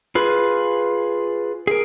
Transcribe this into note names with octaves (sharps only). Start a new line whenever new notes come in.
F4 G#4 B4
G#4 A#4